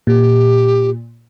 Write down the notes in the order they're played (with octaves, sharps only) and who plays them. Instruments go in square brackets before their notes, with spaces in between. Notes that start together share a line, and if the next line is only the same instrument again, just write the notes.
[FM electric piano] A#2 [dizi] G4